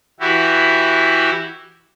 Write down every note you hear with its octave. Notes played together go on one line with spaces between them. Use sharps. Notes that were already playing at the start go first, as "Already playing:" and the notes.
E3 E4 F#4 G4